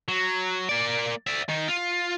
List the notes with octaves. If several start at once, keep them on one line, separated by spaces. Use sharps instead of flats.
F#3
A#3 D5
D5 E5
D#3 D#4
F4